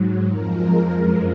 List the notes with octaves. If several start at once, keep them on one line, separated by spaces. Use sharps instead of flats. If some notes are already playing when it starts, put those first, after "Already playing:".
Already playing: G#2 F#3
F2 F3 G#3 A#4
F#2 F3 G#3